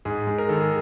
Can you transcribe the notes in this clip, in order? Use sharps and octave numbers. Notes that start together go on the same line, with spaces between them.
G#2 G#4
G#3
A#4
D#3 A4
G#4